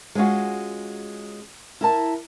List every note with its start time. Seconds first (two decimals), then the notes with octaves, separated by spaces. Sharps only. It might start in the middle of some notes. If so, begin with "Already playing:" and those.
0.15 G#3 C#4 F4 F#4
1.81 E4 A#4 A5